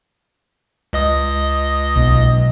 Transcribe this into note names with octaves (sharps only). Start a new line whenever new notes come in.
C#2 D#5 D#6
B1